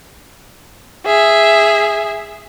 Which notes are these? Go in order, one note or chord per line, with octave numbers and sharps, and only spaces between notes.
G#4 E5